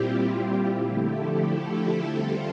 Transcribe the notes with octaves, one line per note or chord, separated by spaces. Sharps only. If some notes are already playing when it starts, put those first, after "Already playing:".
Already playing: A#2 G3 C4 E4 F4 G4
G4
F4
D3 F3 A3 E4 G4
A4
A4
E2 D3 G3 C4 F4